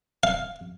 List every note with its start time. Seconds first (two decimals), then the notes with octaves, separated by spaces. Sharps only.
0.23 F5